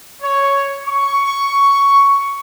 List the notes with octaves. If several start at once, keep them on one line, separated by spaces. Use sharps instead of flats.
C#5
C#6